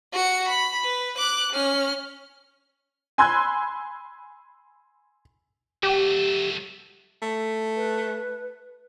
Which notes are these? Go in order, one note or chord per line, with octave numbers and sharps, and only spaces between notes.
F#4 C#7
B5
B4
D6 F#6
C#4 F6
G#5 B5 C6 E6 F#6 G#6
F#3 A3 G4
A3
B4